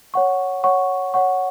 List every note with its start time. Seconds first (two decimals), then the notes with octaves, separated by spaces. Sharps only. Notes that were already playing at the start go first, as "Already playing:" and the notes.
0.14 C#5 F#5 C#6
0.64 C#5 F#5 C#6
1.14 C#5 F#5 C#6